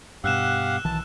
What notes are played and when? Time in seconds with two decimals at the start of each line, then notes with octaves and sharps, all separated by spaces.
0.24 G2 B2 G4 F5 F#5 E6 F#6 E7
0.85 B1 D#3 E3 A5